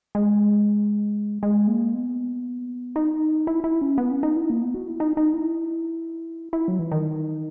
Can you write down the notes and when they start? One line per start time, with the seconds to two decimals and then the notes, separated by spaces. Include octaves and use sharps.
0.15 G#3
1.43 G#3
1.67 A#3
1.94 B3
2.96 D#4
3.47 E4
3.64 E4
3.81 C#4
3.98 B3
4.11 C#4
4.23 D#4
4.36 E4
4.50 A#3
4.62 B3
4.74 F#4
4.88 E4
5.00 D#4
5.17 D#4
5.34 E4
6.53 E4
6.68 F#3
6.79 E3
6.92 D#3